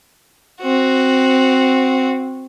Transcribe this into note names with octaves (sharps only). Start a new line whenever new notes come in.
C4 F#4